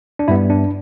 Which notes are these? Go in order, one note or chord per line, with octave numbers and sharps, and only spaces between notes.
D4
G2 G3 B3 E4
D4